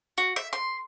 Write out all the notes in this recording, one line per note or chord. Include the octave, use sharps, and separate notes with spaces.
F#4
E5
C6